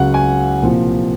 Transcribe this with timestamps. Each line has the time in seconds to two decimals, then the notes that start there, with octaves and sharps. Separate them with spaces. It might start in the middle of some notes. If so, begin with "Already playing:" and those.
Already playing: C#2 C#3 F#3 F#5
0.14 G#5
0.61 C2 A#2 F3